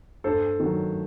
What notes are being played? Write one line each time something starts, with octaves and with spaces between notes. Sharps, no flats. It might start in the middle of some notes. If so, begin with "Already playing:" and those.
G2 A4 C5
D#3 F#3